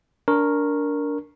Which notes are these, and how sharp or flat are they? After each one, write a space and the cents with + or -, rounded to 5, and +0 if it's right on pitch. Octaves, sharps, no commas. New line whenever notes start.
D4 -20 A#4 +0 C#6 -15